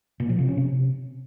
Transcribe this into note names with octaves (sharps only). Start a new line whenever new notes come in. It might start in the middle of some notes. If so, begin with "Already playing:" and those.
A#2
F3
C3
C#4
C3